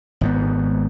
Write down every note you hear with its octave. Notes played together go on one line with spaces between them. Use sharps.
G#1 G#2 B3